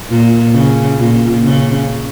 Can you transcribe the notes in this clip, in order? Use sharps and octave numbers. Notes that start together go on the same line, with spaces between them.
A#2
C#3
A#2
C#3